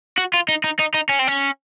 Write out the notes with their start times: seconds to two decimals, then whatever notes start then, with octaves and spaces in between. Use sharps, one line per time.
0.18 F#4
0.34 F4
0.48 D#4
0.64 D#4
0.79 D#4
0.94 D#4
1.09 C#4
1.19 C4
1.27 C#4